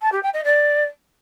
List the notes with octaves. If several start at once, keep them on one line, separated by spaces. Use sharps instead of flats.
A5
G4
G5
D#5
D5